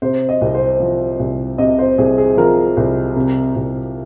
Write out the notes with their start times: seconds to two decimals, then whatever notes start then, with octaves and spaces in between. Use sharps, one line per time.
0.02 C3 C5
0.29 D#5
0.41 C2
0.55 C5
0.80 F3
1.19 C2
1.58 C3 D#5
1.79 C5
1.98 C2 G#4
2.18 G#4
2.37 F3 A#4
2.77 C2
3.16 C3
3.56 C2